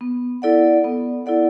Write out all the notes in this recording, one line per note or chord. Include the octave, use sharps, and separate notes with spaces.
B3
E4 A4 D5 F#5
B3
E4 A4 D5 F#5